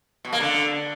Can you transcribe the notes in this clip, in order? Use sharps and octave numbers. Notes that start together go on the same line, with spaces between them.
B2
A#3
D3